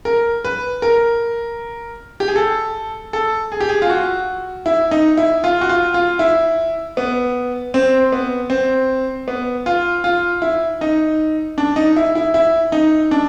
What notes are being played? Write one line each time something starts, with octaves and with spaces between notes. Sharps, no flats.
A#4
B4
A#4
G4
G#4
A4
A4
G#4
G4
G#4
F4
F#4
E4
D#4
E4
F4
F#4
F4
F4
E4
B3
C4
B3
C4
B3
F4
F4
E4
D#4
D4
D#4
E4
E4
E4
D#4
D4